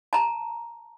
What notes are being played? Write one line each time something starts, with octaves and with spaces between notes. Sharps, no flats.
A5 A#5